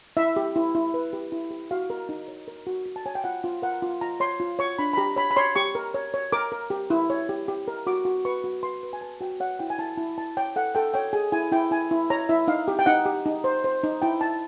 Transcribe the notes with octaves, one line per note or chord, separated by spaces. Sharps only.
E4 E5
G4
E4
E4
B4
G4
E4
G4
F#4 F5
A#4
D#4
C#5
A#4
F#4
F#4
A5
C#5 G#5
G5
F4 F#5
F4
A#4 F#5
F4
F4 A#5
C#5 C6
F4
C#5 C#6
D4 B5
B5
G4 A#5
C#5 B5
B5
C#5 C6
G4 C#6
A#4
C#5
C#5
A#4 D6
A#4
G4
E4
C#5
G4
G4
A#4
F#4 D6
F#4
B4 C#6
F#4
B4 C6
B4
G#5
B4 A5
F#4 G5
C#5 F#5
E4 G5
G#5
E4 A5
E4 A5
E4 A5
C#5 G5
A4 F#5
A4 G5
C#5 G5
G#4 G#5
E4 G#5
E4 G5
E4 G#5
E4
C#5 A#5
E4 E5
D#4 F5
G4
G5
D#4 F#5
G4
D#4
C5
C5
D#4
E4 G5
E4 A5